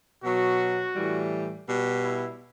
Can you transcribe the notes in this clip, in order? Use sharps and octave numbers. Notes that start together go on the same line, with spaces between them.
B2 F#3 F#4
A2 E3 G3
B2 G3
E4